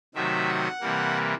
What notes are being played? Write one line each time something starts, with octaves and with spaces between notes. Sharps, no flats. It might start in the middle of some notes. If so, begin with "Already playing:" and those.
C3 D#3 F#3 A3 E5
F#5
C3 E3 G3 A#3